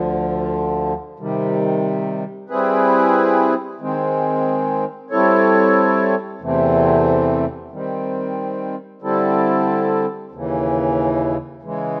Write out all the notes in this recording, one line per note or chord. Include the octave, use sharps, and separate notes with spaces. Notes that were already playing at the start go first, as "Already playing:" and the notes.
Already playing: D2 D3 F3
C3 D#3 G3
G3 C4 E4 G#4 B4
D#3 G#3 C4
G3 C4 E4 A4 C#5
E2 C3 E3 A3 C4
D#3 G3 C4
D3 G3 C4 E4 A4
D#2 C#3 E3
C#3 E3 G#3